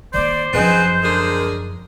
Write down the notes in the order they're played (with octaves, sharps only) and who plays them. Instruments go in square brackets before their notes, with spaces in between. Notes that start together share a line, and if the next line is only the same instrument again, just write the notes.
[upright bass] D#3 A#3 [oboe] C5 [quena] D5
[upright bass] F#2 F3 [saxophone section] C4 D#4 B4 [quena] G#4
[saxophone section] D3 G#3 G#4 [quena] A#4